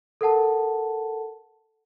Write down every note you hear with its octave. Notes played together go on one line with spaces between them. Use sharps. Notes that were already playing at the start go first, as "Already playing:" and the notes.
A4 A#4 F#5 A5